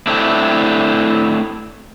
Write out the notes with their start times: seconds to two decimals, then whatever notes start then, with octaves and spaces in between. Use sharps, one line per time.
0.07 A3 C4 D4 E4